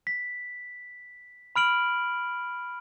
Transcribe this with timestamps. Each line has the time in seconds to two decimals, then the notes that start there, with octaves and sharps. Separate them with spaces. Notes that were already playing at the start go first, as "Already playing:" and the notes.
0.07 B6
1.56 B5 F6 D7 F#7